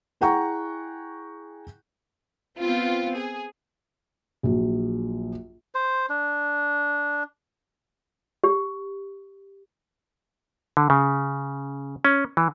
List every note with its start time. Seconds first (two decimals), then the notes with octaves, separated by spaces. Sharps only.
0.21 E4 G#4 F#5 G5 A#5 C#6
2.59 B3 C4 F4
3.17 G#4
4.43 A#1 F#3
5.75 C5
6.09 D4
8.44 G4
10.77 D3
10.90 C#3
12.05 C#4
12.37 E3